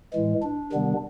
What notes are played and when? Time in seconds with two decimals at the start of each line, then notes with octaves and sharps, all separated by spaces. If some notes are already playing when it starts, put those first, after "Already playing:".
0.13 A2 E3 G#3
0.42 D4
0.72 C3 D#3 G3 B3